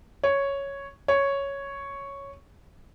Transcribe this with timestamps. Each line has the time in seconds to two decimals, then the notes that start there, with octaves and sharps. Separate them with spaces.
0.23 C#5
1.08 C#5